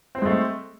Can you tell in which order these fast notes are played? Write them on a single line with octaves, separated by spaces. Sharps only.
C4 C5 G#3 A3